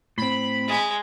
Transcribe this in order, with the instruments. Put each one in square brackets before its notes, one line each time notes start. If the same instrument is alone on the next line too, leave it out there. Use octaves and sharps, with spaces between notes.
[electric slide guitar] A2 C4 [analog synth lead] B5
[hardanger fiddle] G#3